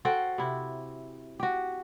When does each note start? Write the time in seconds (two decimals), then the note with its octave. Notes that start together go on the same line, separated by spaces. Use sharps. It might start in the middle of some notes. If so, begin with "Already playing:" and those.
0.05 F#4 A4 C5 G5
0.38 C3 E4
1.40 F#4 G4